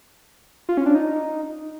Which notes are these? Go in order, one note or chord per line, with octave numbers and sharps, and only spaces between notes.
F4
C#4
D4
D#4